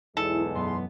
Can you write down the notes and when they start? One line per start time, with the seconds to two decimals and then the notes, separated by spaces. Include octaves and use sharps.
0.17 B1 E2 G#3 E4 A4
0.55 F#2 B3 B4 C6